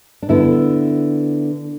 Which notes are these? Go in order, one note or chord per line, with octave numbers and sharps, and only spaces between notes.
D4
D3 B3 E4